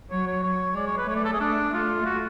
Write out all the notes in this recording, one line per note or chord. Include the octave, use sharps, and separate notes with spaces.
F#3 C#5
C#5
F#3 C#5
G#3 D5
C#5
B4
A3 C#5
D5
A4
G#4
A3 D4
A3 F4
F#4